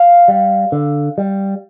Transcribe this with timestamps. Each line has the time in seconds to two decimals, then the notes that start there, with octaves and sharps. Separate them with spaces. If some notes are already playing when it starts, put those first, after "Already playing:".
Already playing: F5
0.28 G3
0.72 D3
1.18 G3